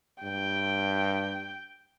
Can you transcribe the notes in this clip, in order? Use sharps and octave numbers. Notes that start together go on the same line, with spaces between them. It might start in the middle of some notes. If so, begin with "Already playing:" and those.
G2 G5